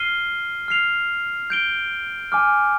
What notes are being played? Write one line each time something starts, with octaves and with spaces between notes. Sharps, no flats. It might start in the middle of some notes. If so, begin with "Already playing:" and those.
Already playing: F6 C7 D#7 G7
F6 C7 F7
G6 D7 G7
G#5 D6 F6